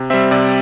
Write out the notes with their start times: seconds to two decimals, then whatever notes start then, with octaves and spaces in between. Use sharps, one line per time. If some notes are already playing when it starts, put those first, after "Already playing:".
Already playing: C3
0.10 G3 C4 E5
0.31 C3 D5